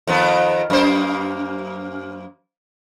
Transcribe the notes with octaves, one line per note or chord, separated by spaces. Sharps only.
F2 D#3 B3
F#2 A#3 C5